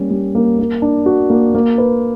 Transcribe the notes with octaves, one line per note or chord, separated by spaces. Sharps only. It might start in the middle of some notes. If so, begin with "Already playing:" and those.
Already playing: G3 A#3 C#4
G3
A#3
A#3
D4
F#4
A#3
A#3
B4